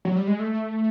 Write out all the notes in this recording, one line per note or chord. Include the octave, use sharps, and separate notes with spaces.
F#3
G3
G#3
A3